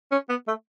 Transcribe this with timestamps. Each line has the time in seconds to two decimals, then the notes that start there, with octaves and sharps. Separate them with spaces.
0.12 C#4
0.29 B3
0.48 A3